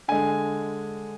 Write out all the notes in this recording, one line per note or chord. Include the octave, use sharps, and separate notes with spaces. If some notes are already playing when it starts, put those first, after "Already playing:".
D3 G#3 G#5